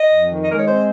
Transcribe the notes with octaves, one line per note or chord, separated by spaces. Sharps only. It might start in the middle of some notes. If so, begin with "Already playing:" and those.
Already playing: D#5
F2
D#3
D#5
G#3 A#4
C#5
C4 C5